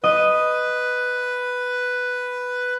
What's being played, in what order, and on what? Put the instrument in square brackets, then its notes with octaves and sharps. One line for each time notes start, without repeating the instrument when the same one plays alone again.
[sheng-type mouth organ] B4 [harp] D#5 D#7